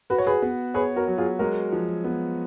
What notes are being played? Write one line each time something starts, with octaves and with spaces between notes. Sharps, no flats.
F#4 B4
C#5
G#4 B4
B3
G#4 B4 C#5
F#4 A#4
F#3
F4 G#4
G#3 F#4 A#4
F3
B3